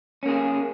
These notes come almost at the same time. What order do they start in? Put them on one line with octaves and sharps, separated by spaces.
C#4 A#3 G#4